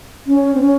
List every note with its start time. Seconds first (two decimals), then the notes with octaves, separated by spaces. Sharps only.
0.26 C#4
0.55 C4
0.61 C#4